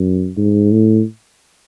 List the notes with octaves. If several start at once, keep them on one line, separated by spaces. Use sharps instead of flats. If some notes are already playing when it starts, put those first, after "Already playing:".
Already playing: F#2
G#2
A2